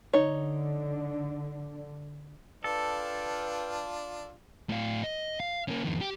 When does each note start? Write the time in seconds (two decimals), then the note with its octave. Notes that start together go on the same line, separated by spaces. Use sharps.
0.13 D3 D#4 C#5
2.64 D4 F4 A4 B4 F5 G5
4.69 A2 F5
5.04 D#5
5.40 F5
5.68 A#3 C#4
5.84 F2 D#3
6.01 G4